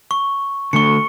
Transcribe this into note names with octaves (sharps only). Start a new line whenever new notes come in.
C#6
D3 A3 C#6 C#7